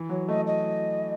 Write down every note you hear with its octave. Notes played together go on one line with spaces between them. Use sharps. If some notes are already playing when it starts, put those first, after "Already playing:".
Already playing: E3
F#3 C#5
A3 D#5
D#5